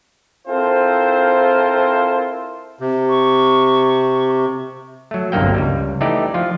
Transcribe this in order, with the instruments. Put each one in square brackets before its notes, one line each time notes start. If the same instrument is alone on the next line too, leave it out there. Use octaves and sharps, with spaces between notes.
[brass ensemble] C4 E4 F4 A4 A#4 C5
[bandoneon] C3
[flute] C#6
[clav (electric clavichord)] F#3 A3
G1 C2 D3 F#3 A#3 G5
C#2 G3
E3 A3 D#4 G4 D5
F3 F4